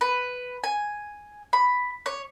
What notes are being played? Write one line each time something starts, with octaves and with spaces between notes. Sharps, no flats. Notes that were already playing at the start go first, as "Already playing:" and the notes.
B4
G#5
B5
C#5